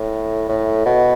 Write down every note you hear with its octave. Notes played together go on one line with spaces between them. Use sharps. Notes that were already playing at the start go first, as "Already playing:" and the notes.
Already playing: A2
A2
B2